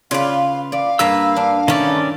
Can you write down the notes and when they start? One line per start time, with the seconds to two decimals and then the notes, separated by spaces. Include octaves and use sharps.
0.11 C#3 F4 B4 D5 F5
0.72 D5 F5
0.99 G2 A#3 B4 A#5 E6
1.37 D4
1.68 D#3 A3 C#4 B4 D5 B5